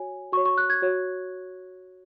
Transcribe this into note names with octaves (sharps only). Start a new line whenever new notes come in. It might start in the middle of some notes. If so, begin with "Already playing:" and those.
Already playing: F#4 C#5 G#5
F#4 C#5 C#6
C#6
F#6
G#6
F#4 C#5